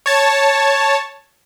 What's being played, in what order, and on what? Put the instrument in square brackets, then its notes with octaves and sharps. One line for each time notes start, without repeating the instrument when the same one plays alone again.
[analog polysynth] C#5 A5